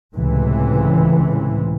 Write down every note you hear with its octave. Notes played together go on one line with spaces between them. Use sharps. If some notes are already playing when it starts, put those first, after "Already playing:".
C#2 A2 C3 E3